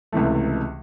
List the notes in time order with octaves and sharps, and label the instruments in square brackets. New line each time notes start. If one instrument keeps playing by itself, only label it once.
[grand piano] C#2 C3 E3 A3